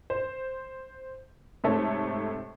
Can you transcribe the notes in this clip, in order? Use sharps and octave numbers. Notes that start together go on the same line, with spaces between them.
C5
G#2 C3 A3 A4 C#5